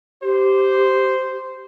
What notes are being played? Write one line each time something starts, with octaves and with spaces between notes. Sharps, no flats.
G4 C5